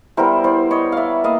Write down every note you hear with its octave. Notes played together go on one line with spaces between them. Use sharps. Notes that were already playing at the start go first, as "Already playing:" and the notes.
G3 B3 E4 A#4 C5
C5 D5
C#5 D#5
D5 E5 F5
A#3 D#5 F5